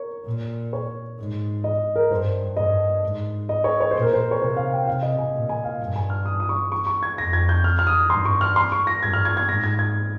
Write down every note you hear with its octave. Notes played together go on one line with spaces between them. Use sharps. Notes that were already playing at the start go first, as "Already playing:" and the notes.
Already playing: A#4 C#5
A#2
C#5
G#2
D#5
A#4
G2 C5
G2 D#5
G#2
D#5
C#5
C#5
A#2 C5
A#4
C5
C#5
C3 C5
F5
G5
C3 F5
D#5
G#5
A#2
G#5
F5
G2
G#5
F6
D#6
D#6
C#6
C#6
C#6
G#6
F2 A#6
G#6
G6
F6
F6
D#6
G2 C6
C#6
F6
C6
C#6
A#6
G2 G#6
F6
G#6
G#6
G#2 A#6
G#6
G#6